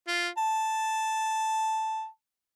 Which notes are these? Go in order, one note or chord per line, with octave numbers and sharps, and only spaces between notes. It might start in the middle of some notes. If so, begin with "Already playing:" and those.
F4
A5